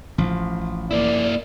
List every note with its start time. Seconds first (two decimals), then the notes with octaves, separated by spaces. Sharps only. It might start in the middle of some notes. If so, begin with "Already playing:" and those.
0.18 A1 F3
0.91 A#3 E4 D5